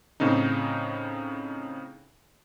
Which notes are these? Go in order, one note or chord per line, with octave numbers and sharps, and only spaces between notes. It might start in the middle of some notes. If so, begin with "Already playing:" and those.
A2 C#3 C4 D#4